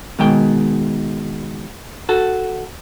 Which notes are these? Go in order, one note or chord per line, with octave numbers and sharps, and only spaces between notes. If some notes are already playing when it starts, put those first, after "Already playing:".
B2 D#3 G#3 G5
F#4 A4